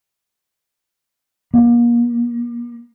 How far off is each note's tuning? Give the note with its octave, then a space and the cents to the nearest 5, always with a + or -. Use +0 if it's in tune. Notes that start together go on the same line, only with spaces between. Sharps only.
A#3 +35